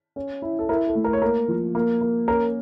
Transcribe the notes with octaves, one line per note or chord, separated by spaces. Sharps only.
C#4
E4
A4
E4 A#4
A4
A3
A#4
C#5
A#3 A#4
F3
A#3
A#3
C#4 A#4